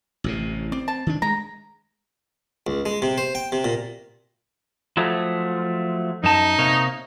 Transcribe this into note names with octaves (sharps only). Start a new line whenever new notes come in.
A1 A2 C3
C4 D5
A5
D#3 D4
G#3 A#5
C#2
G#3
C3
C5
G5
C3
A#2
F3 F#3 A3
F#2 D#4 A5
C3 A#3 C#5